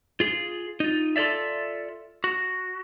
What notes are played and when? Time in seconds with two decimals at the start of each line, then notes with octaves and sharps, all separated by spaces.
0.20 F4 G#4
0.80 D#4 F4
1.16 F4 A4 C5 D5 E5
2.24 F#4